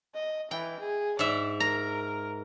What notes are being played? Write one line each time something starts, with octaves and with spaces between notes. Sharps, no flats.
D#5
E3 G5
G#4
G#2 D5 E5
A#4 A#5